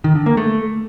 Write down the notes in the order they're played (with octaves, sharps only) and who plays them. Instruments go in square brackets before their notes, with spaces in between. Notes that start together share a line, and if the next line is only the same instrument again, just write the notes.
[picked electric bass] D#3
D3
A#3
A3